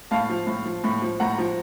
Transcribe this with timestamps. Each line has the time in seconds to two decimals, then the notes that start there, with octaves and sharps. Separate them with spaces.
0.11 A2 F5 A5
0.29 F3
0.47 A2
0.66 F3
0.84 A2
1.02 F3
1.20 A2 F#5 A#5
1.38 F3